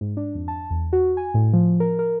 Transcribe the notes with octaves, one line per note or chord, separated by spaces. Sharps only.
G#2
D4
F2
A5
E2
F#4
G#5
A2
F3
A#4
A#4